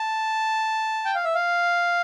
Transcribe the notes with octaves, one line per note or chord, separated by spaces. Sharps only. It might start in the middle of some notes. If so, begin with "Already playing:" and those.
Already playing: A5
G5
F5
E5
F5